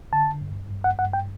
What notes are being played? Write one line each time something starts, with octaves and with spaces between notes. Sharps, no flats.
D3 A5
G2
G2
F#5
G2 F#5
G5